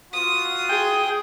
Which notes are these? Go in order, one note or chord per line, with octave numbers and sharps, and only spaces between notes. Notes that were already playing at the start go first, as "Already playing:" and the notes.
F4 F#4 D#6
G#4 G5